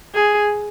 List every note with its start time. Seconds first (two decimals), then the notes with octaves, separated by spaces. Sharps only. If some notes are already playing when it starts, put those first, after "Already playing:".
0.15 G#4